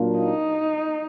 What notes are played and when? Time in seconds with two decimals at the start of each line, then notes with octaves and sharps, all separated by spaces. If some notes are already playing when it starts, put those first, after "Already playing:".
Already playing: A#2 F#3 A#3 D4 F4
0.18 D#4